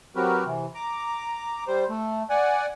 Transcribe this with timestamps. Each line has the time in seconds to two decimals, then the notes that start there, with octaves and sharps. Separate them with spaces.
0.16 F#3 C4 F#4 G4 A#4 B4
0.45 C3 E3
0.75 A#5 D6
1.67 G3 C5
1.89 A3
2.30 D5 F#5 G#5